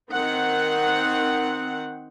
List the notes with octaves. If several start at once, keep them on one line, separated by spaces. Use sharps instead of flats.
D#3 C4 F#5